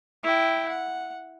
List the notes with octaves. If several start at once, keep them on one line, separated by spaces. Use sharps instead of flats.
E4 G5
F#5